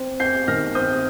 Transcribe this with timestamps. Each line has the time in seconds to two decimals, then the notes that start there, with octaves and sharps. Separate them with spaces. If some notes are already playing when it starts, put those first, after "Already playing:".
Already playing: C4
0.20 C4 G6 C7
0.48 D#3 F6 A#6
0.75 C4 D#6 G6